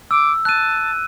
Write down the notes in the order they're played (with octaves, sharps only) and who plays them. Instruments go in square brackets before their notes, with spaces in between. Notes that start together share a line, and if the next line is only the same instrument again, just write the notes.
[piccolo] D6 [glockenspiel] E6
[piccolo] A5 [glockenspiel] F#6 D#7